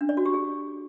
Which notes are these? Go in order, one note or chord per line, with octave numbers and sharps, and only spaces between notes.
D4
D5
F#4
G4
G#4